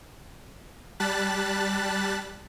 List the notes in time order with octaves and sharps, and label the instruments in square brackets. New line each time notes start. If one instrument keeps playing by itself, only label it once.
[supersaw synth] G3 A5 F#6 A6 B6